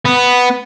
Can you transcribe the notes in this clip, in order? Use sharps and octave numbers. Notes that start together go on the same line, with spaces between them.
B3